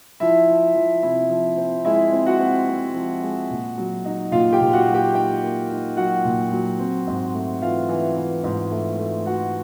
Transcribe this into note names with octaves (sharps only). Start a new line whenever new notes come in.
F3 E4 E5
F3
F3
C3 E4 E5
F3
C4
G#3 E4 E5
C4
F#4 F#5
C4
C4
F3
G#3
A#2
F#3
D#4
A#2 F4 F5
G4 G5
A#2
F#4 F#5
F#3
G4 G5
D#4 G4 G5
A#3
D#4
F#3 F#4 F#5
A#2
F#3
C4
G#2
A3
E3 F4 F5
E3
E3
G#2
A3
A3
A3 F#4 F#5